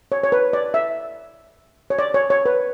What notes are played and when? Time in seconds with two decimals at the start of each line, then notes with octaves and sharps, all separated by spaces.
0.12 C#5
0.24 C#5
0.32 B4
0.53 D5
0.74 E5
1.90 C#5
1.99 D5
2.14 C#5
2.30 C#5
2.46 B4